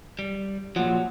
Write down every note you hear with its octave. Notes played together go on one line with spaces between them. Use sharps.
G3
A#2 F3 F#3 F#5